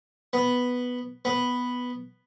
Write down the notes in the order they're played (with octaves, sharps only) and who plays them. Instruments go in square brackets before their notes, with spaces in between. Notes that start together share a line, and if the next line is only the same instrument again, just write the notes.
[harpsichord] B3
B3